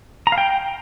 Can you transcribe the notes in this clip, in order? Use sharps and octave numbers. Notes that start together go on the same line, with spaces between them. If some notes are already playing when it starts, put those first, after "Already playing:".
A#5
F5
G5